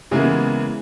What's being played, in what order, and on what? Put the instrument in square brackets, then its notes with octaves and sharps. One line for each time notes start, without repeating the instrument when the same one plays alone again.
[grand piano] C#3 E3 G#3 A#3 B3 E4